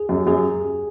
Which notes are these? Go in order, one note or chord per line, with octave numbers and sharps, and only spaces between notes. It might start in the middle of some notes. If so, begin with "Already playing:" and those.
Already playing: G#4
F#2 G4
F#2 G#4